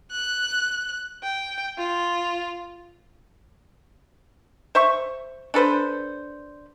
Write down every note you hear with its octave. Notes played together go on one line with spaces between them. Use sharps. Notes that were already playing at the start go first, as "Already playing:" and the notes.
F#6
G5
F4
C5 E5 C#6
D4 A4 B4 C5